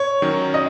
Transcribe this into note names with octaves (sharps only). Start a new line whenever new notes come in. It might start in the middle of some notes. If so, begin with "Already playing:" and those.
Already playing: C#5
D#3 F#3 C#4
D#5